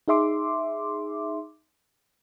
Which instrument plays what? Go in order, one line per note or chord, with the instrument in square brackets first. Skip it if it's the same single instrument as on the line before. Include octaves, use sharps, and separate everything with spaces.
[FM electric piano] D#4 G#4 E5 C6 D6